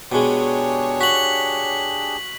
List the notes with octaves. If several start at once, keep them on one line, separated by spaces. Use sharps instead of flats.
B2 G#3 D4 G4 G#4 C#5
F#4 B6 F#7